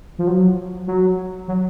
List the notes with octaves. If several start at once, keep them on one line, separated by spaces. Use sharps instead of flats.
F3
F#3
F#3
F#3